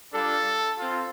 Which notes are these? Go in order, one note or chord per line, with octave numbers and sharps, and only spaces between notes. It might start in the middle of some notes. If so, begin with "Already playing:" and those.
G3 D4 F4 A4
C4 F4